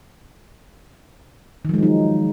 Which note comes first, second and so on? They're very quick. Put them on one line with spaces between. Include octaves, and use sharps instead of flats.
D#3 F3 G#3 F#3 D#4